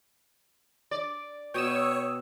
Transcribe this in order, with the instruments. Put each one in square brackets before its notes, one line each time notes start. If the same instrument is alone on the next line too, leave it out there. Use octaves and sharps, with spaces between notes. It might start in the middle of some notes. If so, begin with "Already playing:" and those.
[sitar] D5
[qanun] B2 [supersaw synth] C#5 [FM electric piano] G5 D#6 E6